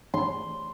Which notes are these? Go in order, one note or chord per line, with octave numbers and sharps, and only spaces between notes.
C6